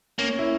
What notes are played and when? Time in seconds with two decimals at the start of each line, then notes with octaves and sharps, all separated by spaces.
0.18 A#3 C#4
0.28 C#4
0.39 E4